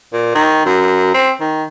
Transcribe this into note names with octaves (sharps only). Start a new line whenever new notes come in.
A#2
D#3
F#2
C4
D#3